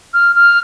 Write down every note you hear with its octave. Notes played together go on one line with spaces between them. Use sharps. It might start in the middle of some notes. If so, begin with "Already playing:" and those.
F6
F6